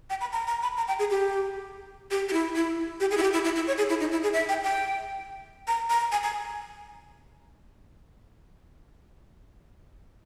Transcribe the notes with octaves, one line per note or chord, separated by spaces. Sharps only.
G5
B5
A#5
A#5
B5
A#5
G5
G#4
G4
G4
G4
E4
E4
G4
G#4
E4
G4
E4
E4
E4
C#5
G#4
E4
D#4
E4
G#4
E5
G5
G5
A#5
A#5
G#5
G#5